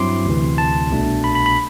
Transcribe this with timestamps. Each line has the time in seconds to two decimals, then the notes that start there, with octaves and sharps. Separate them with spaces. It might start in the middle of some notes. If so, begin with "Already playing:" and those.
Already playing: G2 F#3 C4 E4 C6 D6
0.26 D2 C3 E3
0.58 A5
0.91 C2 B2 A3 D4
1.24 B5
1.35 B5
1.46 B5